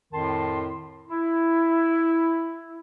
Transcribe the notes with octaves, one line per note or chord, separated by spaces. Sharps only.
F2 A2 D#3 A5 C6
E4